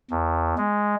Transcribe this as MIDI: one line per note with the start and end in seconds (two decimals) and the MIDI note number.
0.11 0.55 40
0.58 0.95 56